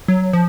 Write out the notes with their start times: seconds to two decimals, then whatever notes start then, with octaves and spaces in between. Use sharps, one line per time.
0.08 F#3
0.33 F3